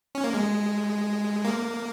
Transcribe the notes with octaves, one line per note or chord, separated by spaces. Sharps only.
C#4
A#3
G#3
A#3